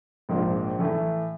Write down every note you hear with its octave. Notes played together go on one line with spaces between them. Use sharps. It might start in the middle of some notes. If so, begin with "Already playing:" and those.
A#1 G#2 F3 A#3 D4
A2 E3 A3